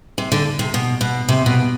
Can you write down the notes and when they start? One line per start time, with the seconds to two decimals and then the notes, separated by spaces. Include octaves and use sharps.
0.18 C3
0.32 D3
0.59 C3
0.74 B2
1.01 B2
1.29 C3
1.46 B2